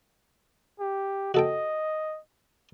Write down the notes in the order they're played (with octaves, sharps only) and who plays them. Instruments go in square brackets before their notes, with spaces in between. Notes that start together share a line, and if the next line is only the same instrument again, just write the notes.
[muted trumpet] G4
[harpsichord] F#4 A4 G5 [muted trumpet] D#5